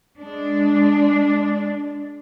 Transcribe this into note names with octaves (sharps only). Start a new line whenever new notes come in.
G#3 D4